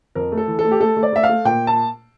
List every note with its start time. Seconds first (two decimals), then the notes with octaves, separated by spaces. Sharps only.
0.15 F2 A#4
0.32 A3
0.38 A4
0.48 E3
0.59 A4
0.65 A3
0.71 G4
0.80 A3 A4
0.97 A3
1.03 D5
1.13 A3 E5
1.23 F5
1.29 A3
1.45 A#2 G5
1.67 A5